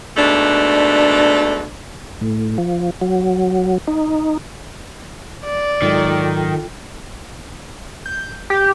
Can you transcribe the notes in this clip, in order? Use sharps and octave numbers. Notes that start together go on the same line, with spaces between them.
G#2 B2 A3 D4
A2
F3
F#3
D#4
D5
G#2 D#3 F#3 G#3 F4 A4 G5
G6
G4